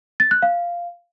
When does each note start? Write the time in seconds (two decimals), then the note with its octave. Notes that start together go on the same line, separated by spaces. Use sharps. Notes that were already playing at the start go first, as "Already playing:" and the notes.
0.20 A6
0.31 F#6
0.42 F5